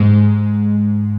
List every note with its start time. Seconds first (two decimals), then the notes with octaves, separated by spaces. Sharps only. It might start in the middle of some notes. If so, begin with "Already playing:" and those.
Already playing: G#2 G#3